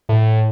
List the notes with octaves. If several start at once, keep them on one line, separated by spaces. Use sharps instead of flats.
A2